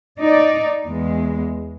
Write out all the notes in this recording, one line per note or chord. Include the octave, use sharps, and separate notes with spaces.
D#4 D5
E2 G#3